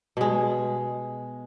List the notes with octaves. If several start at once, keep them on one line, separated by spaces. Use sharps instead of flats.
B2 G#3